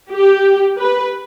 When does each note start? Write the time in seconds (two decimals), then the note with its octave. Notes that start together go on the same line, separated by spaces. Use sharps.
0.11 G4
0.78 B4